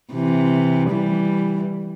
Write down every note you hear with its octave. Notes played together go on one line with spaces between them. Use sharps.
C3 E3
E3 G3